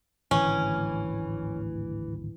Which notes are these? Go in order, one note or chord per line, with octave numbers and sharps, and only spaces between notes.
D1 G#1 D2 E3 C#4